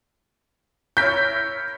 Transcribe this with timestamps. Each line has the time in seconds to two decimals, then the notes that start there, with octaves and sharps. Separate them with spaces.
0.97 E4 A#4 C#5 G6 B6